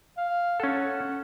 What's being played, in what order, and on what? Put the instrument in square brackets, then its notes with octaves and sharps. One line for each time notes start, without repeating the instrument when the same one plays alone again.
[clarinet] F5
[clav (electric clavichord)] C#4 A4 [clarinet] F#5